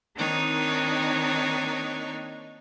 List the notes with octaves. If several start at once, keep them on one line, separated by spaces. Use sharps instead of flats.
D#3 A#3 C4 D4 D#4 C#5